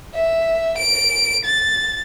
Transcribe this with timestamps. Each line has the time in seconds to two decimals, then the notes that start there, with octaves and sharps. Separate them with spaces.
0.15 E5
0.78 D7
1.45 A6